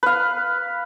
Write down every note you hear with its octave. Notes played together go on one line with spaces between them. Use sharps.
B4 F5